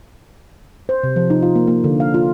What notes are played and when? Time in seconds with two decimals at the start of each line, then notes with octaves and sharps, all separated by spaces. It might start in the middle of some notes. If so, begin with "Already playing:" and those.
0.89 C5
1.04 C3
1.16 F3
1.30 D#4
1.43 F4
1.55 A#3
1.67 A#3
1.84 D3
2.00 F5
2.14 F4